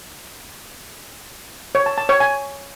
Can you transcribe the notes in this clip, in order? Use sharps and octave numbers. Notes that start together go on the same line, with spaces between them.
C#5
A5
A5
C#5
G#5